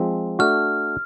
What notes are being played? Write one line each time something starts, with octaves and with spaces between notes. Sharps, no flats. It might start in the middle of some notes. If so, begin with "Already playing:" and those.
Already playing: F3 G#3 C4
A3 D4 F#4 F6